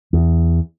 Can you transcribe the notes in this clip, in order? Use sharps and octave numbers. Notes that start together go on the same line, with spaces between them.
E2